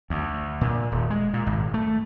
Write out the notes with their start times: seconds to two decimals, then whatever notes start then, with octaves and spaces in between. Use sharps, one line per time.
0.10 D2
0.61 A#2
0.91 D#1
1.10 G#3
1.34 A#2
1.47 G#1
1.74 A3